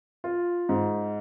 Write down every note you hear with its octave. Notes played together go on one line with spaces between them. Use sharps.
F4
G#2